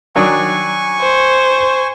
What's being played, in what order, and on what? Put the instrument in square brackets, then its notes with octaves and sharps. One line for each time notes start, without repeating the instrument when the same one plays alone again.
[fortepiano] D#3 F#3 D4 [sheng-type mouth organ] G#5 C#6
[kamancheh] C5